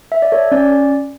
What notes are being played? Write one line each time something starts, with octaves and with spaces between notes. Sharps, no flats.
E5
D5
A4 C#5
C#4 D5